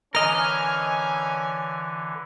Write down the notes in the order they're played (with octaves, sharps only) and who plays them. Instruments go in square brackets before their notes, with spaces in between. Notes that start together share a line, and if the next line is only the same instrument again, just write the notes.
[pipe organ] D3 E3 [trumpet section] C#4 G#5 [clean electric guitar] A#4 D#5 [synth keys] F6